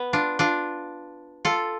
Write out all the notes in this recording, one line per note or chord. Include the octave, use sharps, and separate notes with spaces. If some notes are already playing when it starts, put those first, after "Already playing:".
Already playing: B3
D4 F4
D4 F4
F4 A4